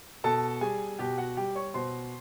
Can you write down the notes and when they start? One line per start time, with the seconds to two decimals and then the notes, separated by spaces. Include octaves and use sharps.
0.24 B2 A4 A5
0.61 G3 G#4 G#5
0.99 B2 G4 G5
1.18 F#4 F#5
1.37 G3 G4 G5
1.55 C#5 C#6
1.74 B2 C5 C6